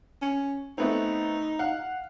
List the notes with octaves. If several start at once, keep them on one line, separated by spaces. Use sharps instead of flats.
C#4
A3 B3 C4 D#4
F5 F#5